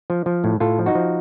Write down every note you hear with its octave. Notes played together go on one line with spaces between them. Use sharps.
F3
F3
A2
A2 F4 A4
F3
D#4 F#4
F3